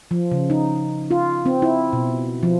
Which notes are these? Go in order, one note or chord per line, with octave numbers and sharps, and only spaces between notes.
F3
C#3
D#4
F4
C4
E4
B2
F3